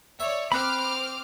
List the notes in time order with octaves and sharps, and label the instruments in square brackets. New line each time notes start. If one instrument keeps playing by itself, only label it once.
[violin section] C#5 D5 [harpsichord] E5
[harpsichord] C4 [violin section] C5 D6 F6 [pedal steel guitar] B5 F#6